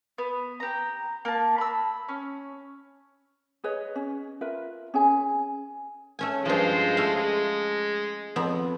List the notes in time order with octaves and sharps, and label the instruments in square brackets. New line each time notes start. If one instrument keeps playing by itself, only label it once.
[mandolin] B3
G4 A#5
A#3 A5
B5 E6
C#4
[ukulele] G#4 B4 C#5 D#5
C#4
F4 A#4 B4 E5
C#4 G#4 G#5
[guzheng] A3 C#4 G#5
[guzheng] G2 F3 [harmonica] G#3 F4 C5
[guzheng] A3 F5
[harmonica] G#3
[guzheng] F2 B3